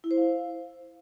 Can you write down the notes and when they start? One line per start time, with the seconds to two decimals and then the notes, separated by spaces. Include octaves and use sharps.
0.04 E4
0.11 C5
0.18 F5